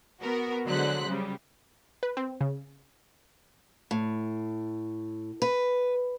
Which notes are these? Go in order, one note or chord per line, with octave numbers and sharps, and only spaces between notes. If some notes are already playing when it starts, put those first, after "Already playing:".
B3 F#4 A#4
D3 F#3 G#3 C5 F#6 B6
C#3 G3
B4
C4
C#3
A2
B4